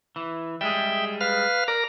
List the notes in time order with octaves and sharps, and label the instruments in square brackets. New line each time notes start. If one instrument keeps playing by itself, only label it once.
[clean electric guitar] E3
[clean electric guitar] G3 G#3 G#4 [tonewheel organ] E5 G5
[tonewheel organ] B4 F5 F6
[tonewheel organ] A#4 A#5 [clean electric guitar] D5